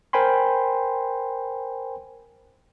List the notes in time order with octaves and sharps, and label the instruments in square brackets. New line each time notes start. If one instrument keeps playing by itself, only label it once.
[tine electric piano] A#4 C5 G5 G#5 B5 C6